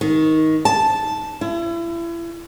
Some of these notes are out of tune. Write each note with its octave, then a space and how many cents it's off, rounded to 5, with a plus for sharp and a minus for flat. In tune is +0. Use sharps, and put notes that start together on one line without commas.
D#3 +15
A5 -5
E4 +35